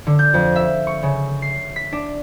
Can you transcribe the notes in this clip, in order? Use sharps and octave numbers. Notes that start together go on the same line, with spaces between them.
D3
G6
F2
E5
C#6
C#3
C7
B6
D4